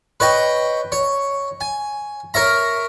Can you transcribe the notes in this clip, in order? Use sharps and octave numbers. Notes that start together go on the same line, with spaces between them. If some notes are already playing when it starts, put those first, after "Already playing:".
B4 C#5 D#5 G5
C#5
G#5
A#4 C#5 E5 A#5